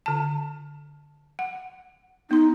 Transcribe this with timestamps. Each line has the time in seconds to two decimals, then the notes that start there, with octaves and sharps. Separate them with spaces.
0.06 D3 A5
1.39 F#5
2.31 B3 D#4 C6